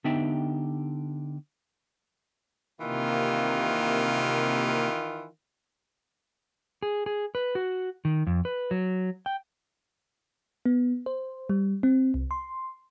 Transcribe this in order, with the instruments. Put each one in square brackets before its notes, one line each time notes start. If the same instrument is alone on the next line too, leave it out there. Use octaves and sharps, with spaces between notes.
[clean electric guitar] D3 B3 D#4 G4 E5 G5
[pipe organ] C3 A#3 [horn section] D#3 E3 F4
[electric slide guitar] G#4
G#4
B4
F#4
D#3
F2
B4
F#3
G5
[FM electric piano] B3
C5
G3
C4
C2
C6